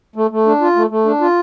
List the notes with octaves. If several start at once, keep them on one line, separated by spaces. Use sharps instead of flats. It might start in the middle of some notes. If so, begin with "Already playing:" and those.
A3
A3
D4
F4
A3
A3
D4
F4